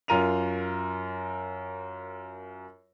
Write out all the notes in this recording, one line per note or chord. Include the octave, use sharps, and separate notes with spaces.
F#2 F4 A#4 D#7 F7